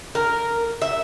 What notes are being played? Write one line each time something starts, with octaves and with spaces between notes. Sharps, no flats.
A#4
E5